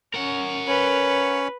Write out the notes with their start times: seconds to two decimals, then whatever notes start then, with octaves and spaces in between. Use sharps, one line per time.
0.14 C#4 A#4 F#5
0.68 C#4 B4 C#5